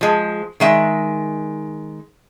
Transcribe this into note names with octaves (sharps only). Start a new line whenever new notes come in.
F3 G#3
D#3 G#3 E5